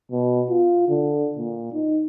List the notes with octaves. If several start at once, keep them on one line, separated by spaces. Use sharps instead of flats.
B2
F4
D3
A#2
D#4